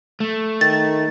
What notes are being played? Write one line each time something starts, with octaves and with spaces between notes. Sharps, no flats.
A3
D#3 A6